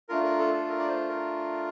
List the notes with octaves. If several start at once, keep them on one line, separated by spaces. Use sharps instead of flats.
A3 D4 F4 A#4
A#4
A4
A4
A#4
D5
C5
A#4